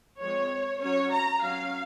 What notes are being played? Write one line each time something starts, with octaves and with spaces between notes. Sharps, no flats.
F3 G#3 C4 C#5
F#3 C#4 C#5
A#5
F#3 C#4 F5